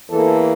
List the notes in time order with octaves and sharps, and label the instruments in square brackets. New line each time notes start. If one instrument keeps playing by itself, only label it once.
[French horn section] E2 E3 A#3 A4